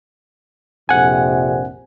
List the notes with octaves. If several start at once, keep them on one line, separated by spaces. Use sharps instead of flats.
A#1 F2 C3 F#5 G#5